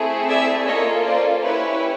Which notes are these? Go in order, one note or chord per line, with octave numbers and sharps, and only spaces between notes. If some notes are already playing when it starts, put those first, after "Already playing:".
Already playing: A3 C4 E4 G#4
D5 E5
A#3 C#4 F4 A4 C#5 D#5
C5 D5
C#4 E4 G4 B4 C#5